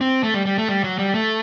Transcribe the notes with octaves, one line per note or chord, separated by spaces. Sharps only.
C4
A3
G3
G3
A3
G3
F#3
G3
A3